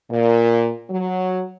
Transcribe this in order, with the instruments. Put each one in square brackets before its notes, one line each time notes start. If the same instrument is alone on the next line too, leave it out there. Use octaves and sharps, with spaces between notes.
[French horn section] A#2
F#3